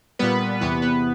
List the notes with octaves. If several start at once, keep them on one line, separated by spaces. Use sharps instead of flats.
A#2 G3 B3 B4
E2 C3 E3 B3 B4
B3 B4